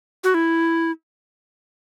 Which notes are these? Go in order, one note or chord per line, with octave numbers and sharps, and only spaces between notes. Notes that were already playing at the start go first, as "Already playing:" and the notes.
F#4
E4